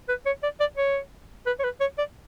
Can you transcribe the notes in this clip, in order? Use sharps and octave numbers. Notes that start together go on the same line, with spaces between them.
B4
C#5
D5
D5
C#5
B4
C#5
B4
C#5
D5